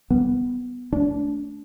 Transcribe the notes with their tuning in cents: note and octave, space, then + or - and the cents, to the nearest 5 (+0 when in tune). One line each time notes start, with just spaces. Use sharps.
G3 +0 B3 +0
A3 -5 D4 -25